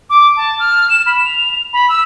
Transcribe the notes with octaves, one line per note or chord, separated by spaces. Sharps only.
D6
A5
F6
E7
B5
F7
B5
E6